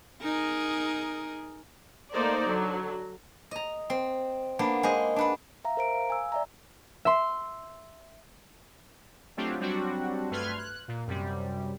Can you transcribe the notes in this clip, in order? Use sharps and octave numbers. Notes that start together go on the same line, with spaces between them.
D#4 G#4 A#4
A3 A#3 D#4 C5 D5
D3 F#3
D#5 A#5
C4
A#3 B3 D4
G#3 G#4 C5 D#5
D4 B4 F#5
E5 F5 A#5
A#4 C5 A#5 D7
F5
G#5 E6
D5 E5 A#5
E5 C6
F#3 A3 C4 D4 F4 G4
F#3 G3 C4 D4 F#4
G2 A3 B4 C6 F6 G#6
F#6
A#2
F#2 C3 G3